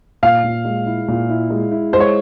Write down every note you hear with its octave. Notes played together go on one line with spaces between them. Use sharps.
A#2 F5
A#2
G#3
E4
A#2
E4
G#3
E4
G#3 C5
C#5